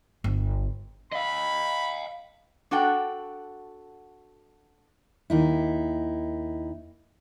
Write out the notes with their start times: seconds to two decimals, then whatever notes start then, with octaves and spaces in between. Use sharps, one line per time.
0.24 G1
1.12 D#5 F5 B5
2.71 D4 F#4 A4 F#5 G5
5.30 D#2 D#4 E4